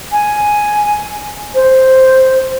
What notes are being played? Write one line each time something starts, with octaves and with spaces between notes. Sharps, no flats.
G#5
C5